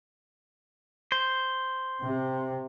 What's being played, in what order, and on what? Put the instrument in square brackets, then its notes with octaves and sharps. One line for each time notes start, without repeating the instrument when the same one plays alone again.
[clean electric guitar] C5
[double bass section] C3